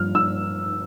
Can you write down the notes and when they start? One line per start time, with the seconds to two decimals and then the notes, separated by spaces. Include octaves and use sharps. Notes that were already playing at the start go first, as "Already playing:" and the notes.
Already playing: G2 F3 F6
0.15 E6